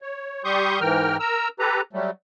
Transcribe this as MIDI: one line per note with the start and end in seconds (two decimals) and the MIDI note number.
0.02 0.42 73
0.44 0.80 55
0.44 0.80 67
0.44 0.80 84
0.44 0.80 85
0.44 0.80 87
0.44 0.80 91
0.81 1.17 44
0.81 1.17 52
0.81 1.17 70
0.81 1.17 79
0.81 1.17 89
1.20 1.48 70
1.20 1.48 82
1.20 1.48 88
1.59 1.81 67
1.59 1.81 69
1.59 1.81 71
1.59 1.81 82
1.93 2.11 54
1.93 2.11 55
1.93 2.11 57